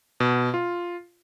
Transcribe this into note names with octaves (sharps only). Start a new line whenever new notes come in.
B2
F4